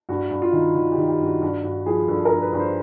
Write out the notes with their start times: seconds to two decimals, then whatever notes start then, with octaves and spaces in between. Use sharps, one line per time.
0.09 G2 F#4
0.31 G2
0.42 F4
0.53 D#3
0.75 D#3 F#4
0.92 G4
0.98 D#3
1.09 G4
1.20 G2
1.25 F#4
1.42 G2 F#4
1.64 G2 F#4
1.86 F3 G#4
2.08 G2 A4
2.25 A#4
2.31 G2
2.42 B4
2.53 G2
2.59 C5